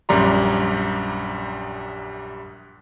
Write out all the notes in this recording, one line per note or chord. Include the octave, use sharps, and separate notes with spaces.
A#1 F#2 G3 D5 A#5 C6